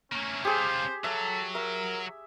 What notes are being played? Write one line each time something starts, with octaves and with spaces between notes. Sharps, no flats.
A3 A#3 C#4
C#4 F4 G4 G#4 C5
F#3 A4 E5
A#4 E5